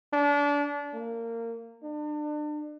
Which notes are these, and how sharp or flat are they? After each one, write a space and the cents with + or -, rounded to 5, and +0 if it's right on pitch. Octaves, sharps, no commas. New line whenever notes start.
D4 -30
A#3 -20
D4 +35